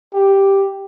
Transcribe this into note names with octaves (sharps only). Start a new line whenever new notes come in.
G4